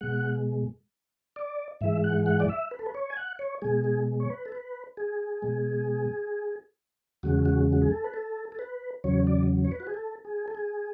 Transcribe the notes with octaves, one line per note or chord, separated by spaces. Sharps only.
B2 G#3 F#5
D5
G#2 E3 G#3 E5
F#5
F#5
D5
E5
B4
A4
B4
C#5
G#5
F#5
C#5
B2 G#3 G#4
G#4
C#5
B4
A4
B4
G#4
B2 G#3
E2 C#3 G#3 F#4
F#4
F#4
G#4
A4
B4
A4
A4
B4
E2 C#3 F#3 C#5
D5
C#5
B4
F#4
G#4
A4
G#4
A4
G#4